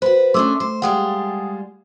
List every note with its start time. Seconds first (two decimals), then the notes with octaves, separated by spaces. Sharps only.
0.02 F#4 B4 C5
0.34 A3 C#4 D4 C6 D6 E6
0.60 C5
0.82 G3 G#3 F4 F#5 G5 D#6